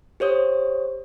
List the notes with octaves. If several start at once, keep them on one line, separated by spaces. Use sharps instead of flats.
G4 C5 C#5 D#6